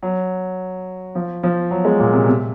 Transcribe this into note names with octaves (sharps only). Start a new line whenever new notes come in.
F#3
F3
F3
F#3
G#3
A#2
C3
C3